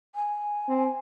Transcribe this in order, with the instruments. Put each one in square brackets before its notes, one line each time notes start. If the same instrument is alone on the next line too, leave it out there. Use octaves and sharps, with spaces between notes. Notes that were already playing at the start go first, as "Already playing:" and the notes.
[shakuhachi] G#5
[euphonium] C4